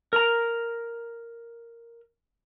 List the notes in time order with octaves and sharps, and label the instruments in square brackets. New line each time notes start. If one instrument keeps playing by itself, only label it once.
[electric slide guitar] A#4 A#5